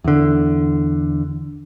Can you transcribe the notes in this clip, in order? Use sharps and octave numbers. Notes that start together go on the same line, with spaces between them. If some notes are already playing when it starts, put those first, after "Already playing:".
E2 D3